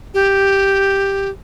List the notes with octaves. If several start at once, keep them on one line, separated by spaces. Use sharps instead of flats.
G4